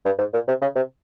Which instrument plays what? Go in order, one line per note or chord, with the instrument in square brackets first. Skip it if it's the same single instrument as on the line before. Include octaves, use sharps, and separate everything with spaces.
[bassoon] G2
G#2
A#2
C3
C#3
C3